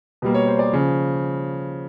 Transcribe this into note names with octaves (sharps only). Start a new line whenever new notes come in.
B2 G3 A#3
C#5
C5
D5
C#3 F3